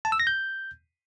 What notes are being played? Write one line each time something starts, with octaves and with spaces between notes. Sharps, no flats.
A5
E6
A#6
G6